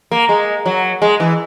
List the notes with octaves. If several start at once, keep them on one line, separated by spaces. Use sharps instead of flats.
A#3
G#3
F#3
G#3
E3